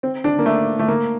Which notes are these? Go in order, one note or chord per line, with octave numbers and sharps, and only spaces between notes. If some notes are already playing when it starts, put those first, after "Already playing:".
C4
D4
A#3
A3
A3
A#3